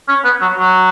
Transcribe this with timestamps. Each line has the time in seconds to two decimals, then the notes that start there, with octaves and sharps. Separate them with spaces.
0.08 C#4
0.24 B3
0.41 F#3
0.59 F#3